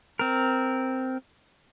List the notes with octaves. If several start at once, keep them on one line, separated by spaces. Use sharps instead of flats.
C4 A#4